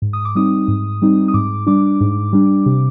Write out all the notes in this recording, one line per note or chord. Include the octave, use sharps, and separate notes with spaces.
G#2
D#6
D6
G3 C4 D#4 D#6
G#2
G3 C4 D#4
D#6
G#2 D6
G3 D4 D6
G#2
G3 D4
C3